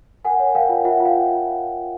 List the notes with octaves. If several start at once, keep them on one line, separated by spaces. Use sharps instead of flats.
A#4 F#5 G#5
C#5
A#4 F5 G5
F4
F4 E5 F#5
F4
F5 G5